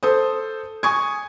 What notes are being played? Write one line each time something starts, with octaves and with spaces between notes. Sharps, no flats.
A4 C5 D#6
G#5 C#6 D#6 G#6